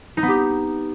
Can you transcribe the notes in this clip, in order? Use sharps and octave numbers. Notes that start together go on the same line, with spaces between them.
D#4
B3
G4